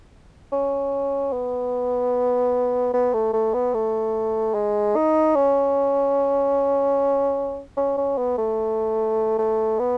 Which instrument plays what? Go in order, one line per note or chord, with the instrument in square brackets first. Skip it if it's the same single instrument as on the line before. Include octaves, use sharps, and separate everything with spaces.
[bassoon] C#4
B3
B3
A3
A3
B3
A3
G#3
D#4
C#4
C#4
C#4
B3
A3
A3
B3